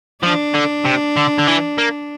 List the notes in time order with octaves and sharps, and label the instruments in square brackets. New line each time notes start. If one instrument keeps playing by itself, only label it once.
[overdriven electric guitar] F3 [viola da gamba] D4
[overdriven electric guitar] D3
C3
D3
D3
E3
A#3